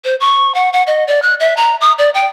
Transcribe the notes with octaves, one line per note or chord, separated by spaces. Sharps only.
C5
C#6
F#5
F#5
D#5
D5
F#6
E5
A#5
D#6
D5
G5